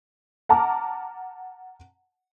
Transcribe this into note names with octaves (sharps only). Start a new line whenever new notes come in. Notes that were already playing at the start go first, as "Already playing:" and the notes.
F#5 A5 A#5 D6 F6